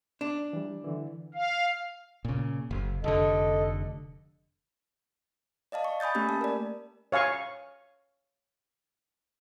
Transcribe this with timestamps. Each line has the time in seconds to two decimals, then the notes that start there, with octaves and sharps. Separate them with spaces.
0.21 D4
0.53 E3 G3
0.84 D3 E3
1.35 F5
2.25 A#2 C#3
2.71 F#1
3.04 F1 D3 A4 D#5
5.72 D5 D#5 F5 A5
5.84 C#6
6.00 G#5 B5 D#6 G6 A6
6.15 A3 A#3 C#4 G4 B5
6.29 A5
6.41 A#4 D5
7.12 C#5 F5 G#5 C#6